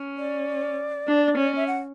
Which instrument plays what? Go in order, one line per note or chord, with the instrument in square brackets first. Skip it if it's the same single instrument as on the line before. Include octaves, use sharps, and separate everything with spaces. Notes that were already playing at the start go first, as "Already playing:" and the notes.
Already playing: [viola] C#4
[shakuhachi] D5
[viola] D4
C#4
[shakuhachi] E5
F#5